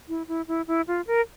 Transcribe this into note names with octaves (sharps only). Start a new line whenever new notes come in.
E4
E4
E4
E4
F4
A#4